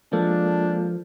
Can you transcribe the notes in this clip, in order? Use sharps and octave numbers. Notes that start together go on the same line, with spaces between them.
F3 G#3 A#3 D4 A4